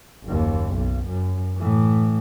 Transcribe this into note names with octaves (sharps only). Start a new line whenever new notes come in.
F#1 D#2
B1
F#2
A2 E3